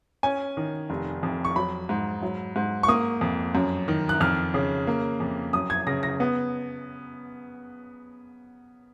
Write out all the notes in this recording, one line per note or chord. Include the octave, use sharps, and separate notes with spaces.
C#4 G#5
D#3
F1
F2
C#6
F#3 B5
G#2
F#3
G#2
C#6
A#3 D#6
F2
F#2
D#3
F#6
F2 F6
C#3
A#3
F2
F#2 D#6
G#6
C#3 A#6
A#6
B3